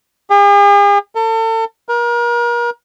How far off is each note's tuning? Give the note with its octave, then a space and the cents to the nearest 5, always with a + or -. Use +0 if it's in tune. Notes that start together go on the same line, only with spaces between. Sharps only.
G#4 -45
A4 +40
A#4 +35